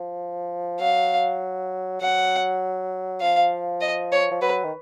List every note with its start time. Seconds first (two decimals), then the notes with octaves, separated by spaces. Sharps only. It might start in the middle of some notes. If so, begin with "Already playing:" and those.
Already playing: F3
0.80 F#3 F5
2.01 F#3 F#5
3.21 F3 F5
3.81 D#5
4.12 C#5
4.31 F3
4.41 F#3 B4
4.64 D#3